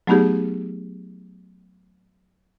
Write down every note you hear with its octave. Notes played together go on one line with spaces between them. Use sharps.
F#3 A3 B3 D#4 G4 G#4